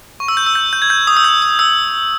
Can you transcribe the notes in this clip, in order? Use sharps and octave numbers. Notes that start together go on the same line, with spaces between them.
C#6
E6
G6
E6
G6
G6
G#6
G6
D#6
E6
G6
D#6
E6